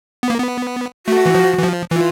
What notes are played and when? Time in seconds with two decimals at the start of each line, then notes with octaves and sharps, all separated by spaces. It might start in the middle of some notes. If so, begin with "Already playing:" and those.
0.23 B3
0.30 A#3
0.39 B3
1.07 A3 F#4
1.26 E3
1.35 F3
1.58 E3
1.64 F3
1.91 E3 F4